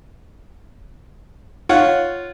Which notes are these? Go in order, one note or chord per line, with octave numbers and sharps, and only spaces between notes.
F4 C#5 F#5